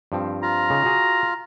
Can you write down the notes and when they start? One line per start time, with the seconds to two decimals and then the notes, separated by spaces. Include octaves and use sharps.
0.12 G2 F3 C4
0.42 F4 A#5
0.70 C#3 D#4
0.85 F#4 G#4